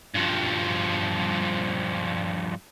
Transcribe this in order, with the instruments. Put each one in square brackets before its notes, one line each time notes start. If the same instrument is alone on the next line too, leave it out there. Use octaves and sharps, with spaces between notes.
[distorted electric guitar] G2 F3